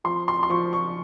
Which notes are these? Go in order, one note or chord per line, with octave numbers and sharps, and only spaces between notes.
F3 C6
C6
C6
F3 C#6
C#6